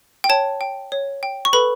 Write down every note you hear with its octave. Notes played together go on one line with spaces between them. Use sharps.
G5
C#5 A5
G5
C#5
G5
C#6
A4 B4 B5